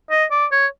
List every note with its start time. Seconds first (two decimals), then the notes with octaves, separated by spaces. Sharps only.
0.10 D#5
0.31 D5
0.52 C#5